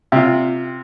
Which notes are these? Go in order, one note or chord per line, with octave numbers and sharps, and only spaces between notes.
C3 F4